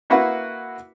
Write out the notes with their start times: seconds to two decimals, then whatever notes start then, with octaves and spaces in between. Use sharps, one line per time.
0.10 A#3 E4 F#4 B4 F#5